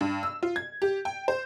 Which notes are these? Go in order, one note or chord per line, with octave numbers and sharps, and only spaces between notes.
G2
E6
F4
G#6
G4
G5
C5